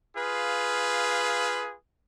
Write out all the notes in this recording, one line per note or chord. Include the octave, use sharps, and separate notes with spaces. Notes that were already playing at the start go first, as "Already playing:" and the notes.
F4 G#4 B4 F5